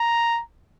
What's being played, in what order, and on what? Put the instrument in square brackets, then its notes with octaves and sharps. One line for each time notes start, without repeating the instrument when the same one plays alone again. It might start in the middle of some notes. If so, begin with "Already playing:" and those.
Already playing: [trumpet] A#5